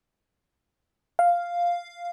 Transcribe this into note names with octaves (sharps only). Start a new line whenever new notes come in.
F5